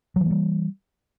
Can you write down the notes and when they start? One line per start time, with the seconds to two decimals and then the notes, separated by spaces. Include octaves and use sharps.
0.16 F#3
0.21 E3
0.26 A#3
0.30 G3